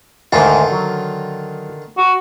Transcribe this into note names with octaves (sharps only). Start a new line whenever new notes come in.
D2 G#2 D3 D#3 F4
F#3
F#4